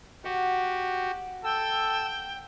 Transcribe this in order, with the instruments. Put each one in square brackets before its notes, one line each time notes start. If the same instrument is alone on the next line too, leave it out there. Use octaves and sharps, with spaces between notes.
[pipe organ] F#4 G4 [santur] F#5
[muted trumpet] A4 [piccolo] G5 [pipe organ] E6